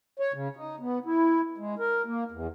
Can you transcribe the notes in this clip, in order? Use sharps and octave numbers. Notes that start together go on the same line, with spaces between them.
C#5
C#3
D#4
B3
E4
G#3
A#4
A#3
E2